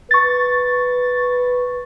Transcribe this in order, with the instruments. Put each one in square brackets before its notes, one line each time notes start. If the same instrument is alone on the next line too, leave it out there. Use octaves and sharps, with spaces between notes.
[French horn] B4 [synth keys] C#6 A6